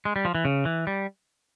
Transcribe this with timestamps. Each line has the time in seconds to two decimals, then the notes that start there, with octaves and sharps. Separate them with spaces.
0.05 G#3
0.16 G3
0.25 F3
0.35 E3
0.45 C#3
0.65 E3
0.87 G3